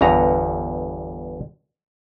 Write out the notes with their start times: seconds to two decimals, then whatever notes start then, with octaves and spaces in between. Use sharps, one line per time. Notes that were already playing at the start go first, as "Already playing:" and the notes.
0.01 G1 E2 G2 A#5